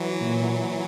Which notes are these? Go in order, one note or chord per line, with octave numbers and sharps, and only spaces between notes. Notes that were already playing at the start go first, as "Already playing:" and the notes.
Already playing: E3 F#3
A#2